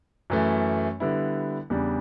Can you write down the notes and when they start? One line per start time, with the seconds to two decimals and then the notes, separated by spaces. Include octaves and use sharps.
0.30 F#2 E3 A3
1.00 D3 G3 B3 E4
1.70 E2 C#3 G3 D4